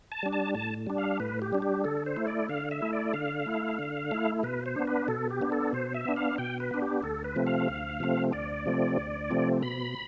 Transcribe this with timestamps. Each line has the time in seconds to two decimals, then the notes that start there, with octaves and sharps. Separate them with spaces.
0.12 A5
0.23 G3 D4
0.33 A5
0.55 A2 A5
0.87 G3 D4
0.98 F5
1.20 A2 B4
1.42 G4
1.53 G3 D4
1.62 G4
1.84 D3 A4
2.06 C5
2.16 A3 E4
2.27 D5
2.49 D3 F5
2.71 E5
2.82 A3 E4
2.93 D5
3.13 D3 F5
3.46 A3 E4
3.79 D3
4.11 A3 E4
4.43 B2 B4
4.66 C5
4.76 B3 D4
4.87 B4
5.08 B2 A4
5.30 G4
5.41 B3 D4
5.52 A4
5.73 B2 C5
5.94 E5
6.05 B3 D4
6.16 F5
6.38 B2 G5
6.60 B4
6.71 B3 D4
6.82 G4
7.03 D2 A4
7.24 B4
7.36 C3 F3 A3 C4
7.47 F5
7.68 D2
8.00 C3 F3 A3 C4
8.33 D2 D5
8.66 C3 F3 A3 C4
8.98 D2
9.30 C3 F3 A3 C4
9.62 B2 B5